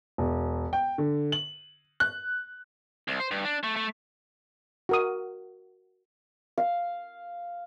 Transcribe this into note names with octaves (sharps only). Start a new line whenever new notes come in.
E1
G5
D3
F#7
F#6
C2
C5
G2
D4
A3
A3
F#4 A#4 D#6
F5